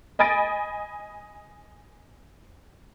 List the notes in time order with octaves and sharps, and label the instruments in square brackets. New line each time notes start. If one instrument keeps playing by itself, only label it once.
[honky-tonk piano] D#5 G#5 B5 A6 D7